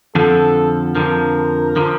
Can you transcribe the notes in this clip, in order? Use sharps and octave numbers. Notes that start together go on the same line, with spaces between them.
F2 D3 F3 A4
F2 D3 F3 A#4
D3 F3